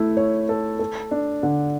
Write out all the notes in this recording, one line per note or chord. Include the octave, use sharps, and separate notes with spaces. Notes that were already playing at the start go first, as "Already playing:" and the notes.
Already playing: A3 E4
C#5
A4
A4
D4
D3